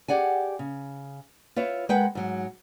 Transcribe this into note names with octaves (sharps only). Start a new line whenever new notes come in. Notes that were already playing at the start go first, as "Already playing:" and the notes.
G4 G#4 D5 F#5 G#5
C#3
F4 B4 C#5 E5
G#3 A#4 B4 F#5 G5
G#2 F#3